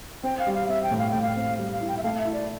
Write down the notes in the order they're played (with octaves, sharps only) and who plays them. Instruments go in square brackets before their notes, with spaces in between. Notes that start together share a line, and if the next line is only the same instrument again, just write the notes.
[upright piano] C4 [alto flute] G5
[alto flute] F5
[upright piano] G3
[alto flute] F5
[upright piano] C4 [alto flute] E5
[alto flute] G5
[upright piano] A2
[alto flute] F5
[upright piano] A2 [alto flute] G5
[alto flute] F5
[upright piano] C4
G3
[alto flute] F5
[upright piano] E4
[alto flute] G5
E5
[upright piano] A3 [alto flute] F5
[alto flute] E5
[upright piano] E4
[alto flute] D5